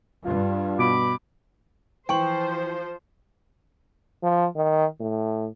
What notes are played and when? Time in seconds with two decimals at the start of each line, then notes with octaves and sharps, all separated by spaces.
0.24 G2 F4
0.79 B2 B5 D6
2.09 E3 F3 C5 G5 C#6 F#7
4.23 F3
4.56 D#3
5.00 A2